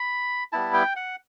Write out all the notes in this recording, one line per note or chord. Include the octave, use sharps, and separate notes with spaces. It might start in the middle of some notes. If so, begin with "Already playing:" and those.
Already playing: B5
G3 B3 E4 A5
G5
F#5